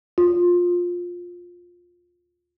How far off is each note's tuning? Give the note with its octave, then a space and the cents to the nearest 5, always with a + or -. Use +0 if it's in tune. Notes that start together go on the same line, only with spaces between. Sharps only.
F4 +15